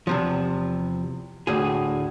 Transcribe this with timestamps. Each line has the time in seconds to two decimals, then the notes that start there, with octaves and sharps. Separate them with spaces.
0.07 E2 C3 F3
1.47 D2 A2 G#4